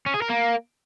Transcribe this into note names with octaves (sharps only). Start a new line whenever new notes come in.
C#4
G#4
A#4
A#3